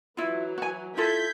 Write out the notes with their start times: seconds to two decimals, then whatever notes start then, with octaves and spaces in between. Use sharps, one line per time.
0.17 E3 F#3 E4 F4
0.58 F#4 G#5
0.97 E4 F4 A4 G6 G#6 B6